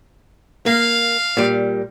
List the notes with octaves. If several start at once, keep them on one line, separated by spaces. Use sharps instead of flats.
A#3 F5
A#2 G3